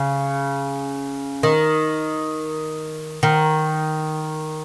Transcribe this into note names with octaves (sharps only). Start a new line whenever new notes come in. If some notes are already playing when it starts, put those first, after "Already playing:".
Already playing: C#3
D#3
D#3